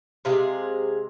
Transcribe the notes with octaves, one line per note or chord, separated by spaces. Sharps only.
C3 F3 G#3 F4 G#4